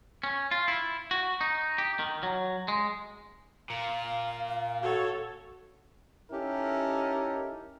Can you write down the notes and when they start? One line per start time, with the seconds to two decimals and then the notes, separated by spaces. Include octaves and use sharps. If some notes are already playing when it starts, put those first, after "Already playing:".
0.23 C#4
0.51 F4
0.68 E4
1.11 F#4
1.41 D#4
1.78 G4
1.99 D#3
2.23 F#3
2.68 G#3
3.70 A#2 F5
4.83 F#4 A4 C#5
6.31 C#4 D#4 E4 G4 A4 A#4